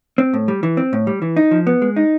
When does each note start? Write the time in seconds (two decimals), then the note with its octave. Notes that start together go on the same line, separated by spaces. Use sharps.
0.18 C4
0.34 A2
0.48 G3
0.63 E3
0.77 C4
0.93 A2
1.07 G3
1.22 E3
1.37 D#4
1.51 F3
1.67 B3
1.82 G#3
1.96 D#4